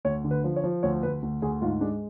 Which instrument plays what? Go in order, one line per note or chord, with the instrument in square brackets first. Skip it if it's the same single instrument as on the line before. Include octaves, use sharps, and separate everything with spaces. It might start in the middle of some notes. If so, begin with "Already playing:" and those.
[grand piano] D2 C#5
D3
B4
F3
C#5
F3
D2 C#5
D2 B4
D2
D2 G#4
G#2 F4
G#3 D4